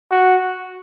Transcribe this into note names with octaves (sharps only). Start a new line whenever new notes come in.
F#4